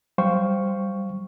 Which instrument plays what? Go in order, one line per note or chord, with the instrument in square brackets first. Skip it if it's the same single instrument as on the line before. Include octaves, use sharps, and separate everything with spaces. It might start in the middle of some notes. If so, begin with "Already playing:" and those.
[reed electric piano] F#3 G3 C5 F5 G5 C#6